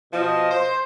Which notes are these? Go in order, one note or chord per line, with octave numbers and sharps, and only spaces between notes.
B2 F3 D#5
C5